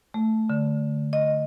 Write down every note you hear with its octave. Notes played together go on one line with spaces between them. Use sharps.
A3
D3
D#5